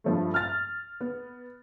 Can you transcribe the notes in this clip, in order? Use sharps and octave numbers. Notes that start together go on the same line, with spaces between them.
G2 F3 A3
F6 A6
B3